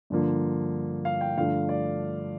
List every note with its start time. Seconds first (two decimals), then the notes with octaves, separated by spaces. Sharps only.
0.10 G2 D3 F3 A#3
1.05 F5
1.21 G5
1.37 G2 D3 F3 A3 F5
1.69 D5